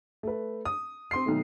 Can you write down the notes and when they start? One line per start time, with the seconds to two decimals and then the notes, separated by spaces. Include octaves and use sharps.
0.23 A3 B4
0.65 D#6
1.11 C4 C6 C7
1.26 B1 D#3 A3